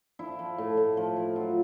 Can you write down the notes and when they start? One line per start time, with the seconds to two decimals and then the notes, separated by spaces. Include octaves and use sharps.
0.19 F3 E4
0.39 F3
0.58 A2
0.77 A2
0.97 F3
1.16 F3
1.36 F#3 F4